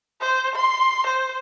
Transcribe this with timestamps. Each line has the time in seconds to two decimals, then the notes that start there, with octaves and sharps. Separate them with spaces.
0.21 C5
0.56 C6
1.07 C5